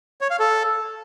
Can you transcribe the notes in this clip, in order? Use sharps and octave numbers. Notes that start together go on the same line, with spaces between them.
C#5
F5
A4